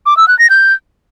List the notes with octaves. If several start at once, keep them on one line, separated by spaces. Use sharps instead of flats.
D6
E6
F#6
A#6
G6